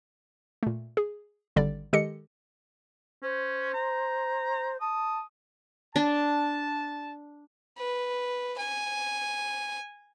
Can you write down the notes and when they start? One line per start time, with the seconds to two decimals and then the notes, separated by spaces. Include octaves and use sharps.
0.63 A#2 A3
0.97 G#4
1.56 G#1 D3 G3 D5
1.93 D#3 G#3 G4 A4 D#5 C#7
3.22 C#4 C5
3.74 A#5
4.81 A5 D#6
5.96 D4 A5
7.78 B4
8.58 G#5